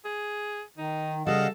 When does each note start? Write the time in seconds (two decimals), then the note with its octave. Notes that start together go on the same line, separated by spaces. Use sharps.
0.05 G#4
0.78 D#3 D#4
1.27 C#3 G3 A4 D#5 F5 F#5